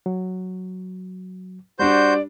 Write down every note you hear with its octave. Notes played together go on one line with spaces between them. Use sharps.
F#3
G3 D4 F#4 C5 D5 G6